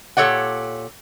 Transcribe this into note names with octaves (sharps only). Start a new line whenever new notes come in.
A#2 G4 A4 C#5 D5 F#5